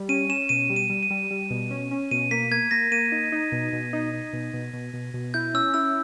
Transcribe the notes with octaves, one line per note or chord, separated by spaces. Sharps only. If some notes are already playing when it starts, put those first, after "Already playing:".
Already playing: G3
C#4 D#7
C#4 E7
B2 D#7
G3
D#7
G3
D#7
G3
G3
B2
C#4
C#4
B2 D#7
A#3 B6
A#3 G#6
A#3 A#6
A#3 D#7
D#4
D#4
B2
B2
D#4
D#4
B2
B2
B2
B2
B2
E4 G6
C#4 E6
E4 E6